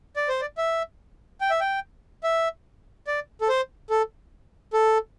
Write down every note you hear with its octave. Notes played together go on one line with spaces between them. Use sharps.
D5
C5
D5
E5
G5
E5
G5
E5
D5
A4
C5
A4
A4